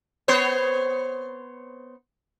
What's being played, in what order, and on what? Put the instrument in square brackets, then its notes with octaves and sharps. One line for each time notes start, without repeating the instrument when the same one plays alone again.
[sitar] B3 C5 C#5